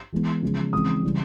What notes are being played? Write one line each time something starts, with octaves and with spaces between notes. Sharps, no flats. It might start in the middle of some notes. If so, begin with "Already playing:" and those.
E3 G#3 B3
C#3 F3 G#3
C#3 E3 G#3 C4 D#6
C#3 E3 G3